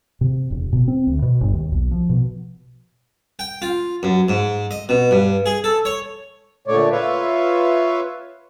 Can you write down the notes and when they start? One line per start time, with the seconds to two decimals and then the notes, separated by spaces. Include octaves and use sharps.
0.21 C3
0.51 E1
0.73 B2
0.88 C4
1.07 D2
1.22 B2
1.41 G1
1.53 D#2
1.72 B1
1.91 F3
2.09 B2
3.39 G5
3.62 F4
4.03 F#2
4.29 G#2
4.71 D#5
4.89 B2
5.11 G2
5.46 G#4
5.64 A4
5.85 C#5
6.68 A#2 D3 A3 C#5 D5
6.91 F4 B4 C#5 E5 F5